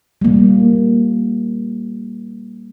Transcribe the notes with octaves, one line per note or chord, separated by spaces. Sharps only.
G3 A#3